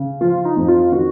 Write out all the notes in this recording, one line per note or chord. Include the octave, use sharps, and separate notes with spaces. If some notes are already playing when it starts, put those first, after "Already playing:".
Already playing: C#3
F3 F4
D#4
F2
F4
D#3 F#4